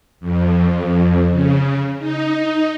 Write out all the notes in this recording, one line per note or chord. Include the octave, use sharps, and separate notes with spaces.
F2
C#3
D#4